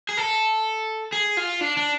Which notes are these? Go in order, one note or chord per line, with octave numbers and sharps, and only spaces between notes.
G#4
A4
G#4
F4
D4
D4